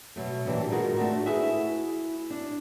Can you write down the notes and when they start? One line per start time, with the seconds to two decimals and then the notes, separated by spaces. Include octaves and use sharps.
0.16 B2 F#3 A3
0.45 D2 A#2 E3 D4 G4
0.70 G#2 D#3 G#3 F4 F#4 A#4
0.97 A3 D4 F#4
1.26 E4 F#4 G#4 B4 E5
2.30 D4